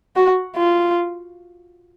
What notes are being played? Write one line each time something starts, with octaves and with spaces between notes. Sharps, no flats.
F#4
F4